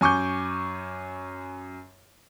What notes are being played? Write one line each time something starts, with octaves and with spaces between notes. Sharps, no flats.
F#2 G#5 C#6 D6 G6